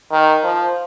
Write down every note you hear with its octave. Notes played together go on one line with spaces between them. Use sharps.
D#3
F3